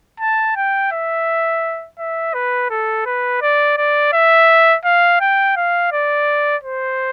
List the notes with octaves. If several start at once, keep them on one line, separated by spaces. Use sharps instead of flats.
A5
G5
E5
E5
B4
A4
B4
D5
D5
E5
F5
G5
F5
D5
C5